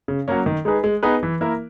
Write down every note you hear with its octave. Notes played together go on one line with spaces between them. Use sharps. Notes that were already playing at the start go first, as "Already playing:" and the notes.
C#3
F#3 A#3 C#4
D#3
G#3 D#4 G#4 B4
G#3
B3 D#4 G#4 B4
E3
A#3 E4 A#4